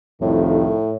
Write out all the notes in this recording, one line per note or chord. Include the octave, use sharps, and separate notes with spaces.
C2 F2 A2 D#3